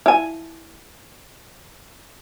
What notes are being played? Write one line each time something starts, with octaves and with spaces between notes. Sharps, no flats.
E4 G#5